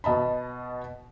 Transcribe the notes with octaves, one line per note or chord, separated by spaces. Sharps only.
B2 D#5 A5 B5